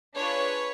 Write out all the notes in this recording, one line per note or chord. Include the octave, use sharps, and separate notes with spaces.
D4 F4 G#4 B4 C#5